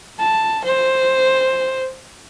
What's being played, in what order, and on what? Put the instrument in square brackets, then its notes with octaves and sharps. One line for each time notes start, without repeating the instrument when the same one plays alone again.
[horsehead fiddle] A5
C5